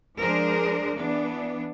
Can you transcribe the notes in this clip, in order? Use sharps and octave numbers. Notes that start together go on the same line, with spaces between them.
F3 G#3 D4 G#4 A#4 C5
E3 B3 D4